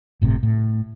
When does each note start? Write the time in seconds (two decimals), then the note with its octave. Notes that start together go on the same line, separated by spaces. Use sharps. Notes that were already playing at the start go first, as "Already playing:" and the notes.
0.22 G1 A2 C3
0.43 A2